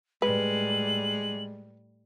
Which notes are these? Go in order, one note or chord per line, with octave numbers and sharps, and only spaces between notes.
A2 G3 G#3 B4 F#7